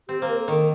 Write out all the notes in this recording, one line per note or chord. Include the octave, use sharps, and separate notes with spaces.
C4 G4
A#3 C5
A#4
A4
D#3 A#4